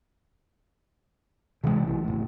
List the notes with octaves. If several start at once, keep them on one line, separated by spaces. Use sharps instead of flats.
C3 E3 F#3 G#3
B1 E3
F#1 A2